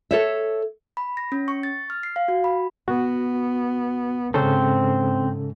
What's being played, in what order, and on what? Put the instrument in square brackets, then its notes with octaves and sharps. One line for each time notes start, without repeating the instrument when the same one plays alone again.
[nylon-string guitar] A4 C#5 E5
[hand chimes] B5
A#6
C#4
C#6
A6
F6
C7
F5
F#4
B5
[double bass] B3 [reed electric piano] F#4
[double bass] G#2 [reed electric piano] C#3 C#4 A4 [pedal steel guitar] C4 C5